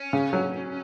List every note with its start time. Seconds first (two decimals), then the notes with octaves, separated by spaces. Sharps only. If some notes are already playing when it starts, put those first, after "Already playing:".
Already playing: C#4
0.13 C#3
0.33 F#3